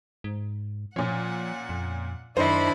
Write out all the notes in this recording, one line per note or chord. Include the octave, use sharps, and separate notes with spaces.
G#2
A#2 F3 C#4 F#5
F2
F#2 D#3 D4 E4 C5 D#5 B5